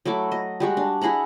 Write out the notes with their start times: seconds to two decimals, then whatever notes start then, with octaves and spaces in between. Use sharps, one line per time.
0.05 F#3 A3 E4 D6
0.31 D#5
0.60 G3 G#3 F#4
0.77 D4
1.01 E4 G#4 F#5 A#5